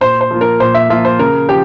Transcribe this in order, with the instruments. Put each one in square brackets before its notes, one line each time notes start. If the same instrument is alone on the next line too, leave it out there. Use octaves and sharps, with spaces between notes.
[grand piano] A#2 [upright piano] C5
[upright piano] C5
[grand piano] F3 A#3 F4
[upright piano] A#4
[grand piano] A#2 [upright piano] C5
[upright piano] E5
[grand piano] F3 A#3 F4 [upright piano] E5
[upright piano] C5
[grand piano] C#3 [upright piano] A#4
[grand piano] F3 [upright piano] G4